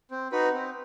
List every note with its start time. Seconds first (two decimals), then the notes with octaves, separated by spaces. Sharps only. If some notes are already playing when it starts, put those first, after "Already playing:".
0.11 C4
0.32 D#4 F#4 B4
0.53 C4